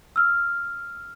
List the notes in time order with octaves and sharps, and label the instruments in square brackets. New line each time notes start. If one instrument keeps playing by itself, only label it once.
[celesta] E6 F6